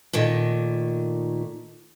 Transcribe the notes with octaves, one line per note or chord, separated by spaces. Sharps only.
A#2 D#3 A3